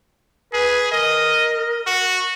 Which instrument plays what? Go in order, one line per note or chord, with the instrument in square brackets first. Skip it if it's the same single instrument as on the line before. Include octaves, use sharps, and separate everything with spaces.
[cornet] G#4 [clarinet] B4
[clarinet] A#4 [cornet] D#5
[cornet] F#4